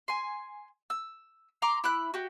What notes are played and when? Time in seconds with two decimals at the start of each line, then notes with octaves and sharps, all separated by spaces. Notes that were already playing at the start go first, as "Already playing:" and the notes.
0.08 G#5 C6
0.90 E6
1.62 A#5 C6 D6
1.84 E4 B5 F#6
2.14 F#4 G4